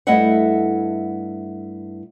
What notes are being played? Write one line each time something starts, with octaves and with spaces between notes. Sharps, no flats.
G2 A3 E4 D#5 E5 F#5